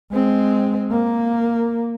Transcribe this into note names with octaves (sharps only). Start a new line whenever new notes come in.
G#3 C4
A#3